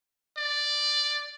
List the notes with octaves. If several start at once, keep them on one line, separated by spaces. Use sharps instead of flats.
D5